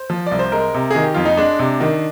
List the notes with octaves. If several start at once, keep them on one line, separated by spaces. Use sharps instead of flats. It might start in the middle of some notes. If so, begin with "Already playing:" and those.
Already playing: C5
F3
C2 D5
C5
G#3 A#4
C3
D#3 G#4
G4
F2 F4
D#4
G#3 D4
C3
D#3